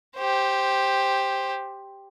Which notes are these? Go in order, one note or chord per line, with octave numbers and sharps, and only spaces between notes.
G4 C5